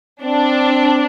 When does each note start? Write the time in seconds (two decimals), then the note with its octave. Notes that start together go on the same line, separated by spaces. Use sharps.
0.22 C4 D4